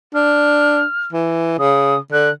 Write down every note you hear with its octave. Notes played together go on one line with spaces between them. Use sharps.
D4 F6
E3
C#3 D#6
D3 F#6